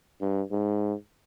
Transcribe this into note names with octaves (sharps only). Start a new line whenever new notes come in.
G2
G#2